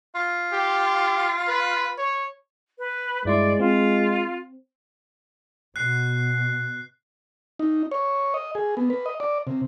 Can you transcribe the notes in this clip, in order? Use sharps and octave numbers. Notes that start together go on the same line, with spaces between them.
F4
G4
B4
C#5
B4
G2 G#3 E4 D5 C6
C4 F4
B2 F#6 C7
D#4
C#5
D#5
G#4
B3
B4
D#5
D5
C3